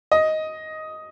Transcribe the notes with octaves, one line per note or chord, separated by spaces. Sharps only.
D#5